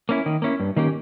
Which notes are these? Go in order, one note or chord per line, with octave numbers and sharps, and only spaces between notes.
A#3 C#4 E4
D#3
A#3 C#4 E4
G2
D#3 A#3 C#4 G4